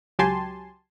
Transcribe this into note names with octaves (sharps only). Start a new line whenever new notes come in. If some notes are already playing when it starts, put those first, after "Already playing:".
C#2 F#3 G4 G#5 A5 C6